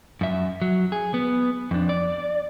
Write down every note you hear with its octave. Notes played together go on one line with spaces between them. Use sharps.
F#2 E5
F#3
G#4
B3
F2 D4
D5